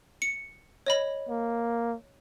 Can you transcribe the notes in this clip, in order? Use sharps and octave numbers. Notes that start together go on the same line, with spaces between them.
C#7
C#5 D#5 B5
A#3